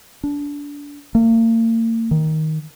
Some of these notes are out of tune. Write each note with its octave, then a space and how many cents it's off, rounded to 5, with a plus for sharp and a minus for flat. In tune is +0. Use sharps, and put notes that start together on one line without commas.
D4 -25
A#3 -40
D#3 +10